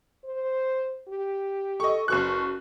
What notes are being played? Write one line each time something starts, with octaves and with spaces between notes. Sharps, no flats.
C5
G4
A4 D#5 C#6
F#1 F#4 B4 C#6 F#6